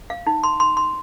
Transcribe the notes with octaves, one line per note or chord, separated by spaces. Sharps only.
F5
D#4
C6
C6
C6